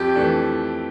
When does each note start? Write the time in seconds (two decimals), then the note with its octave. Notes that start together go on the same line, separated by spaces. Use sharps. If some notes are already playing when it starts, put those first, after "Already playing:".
Already playing: F2 G4
0.15 E3 A3 D4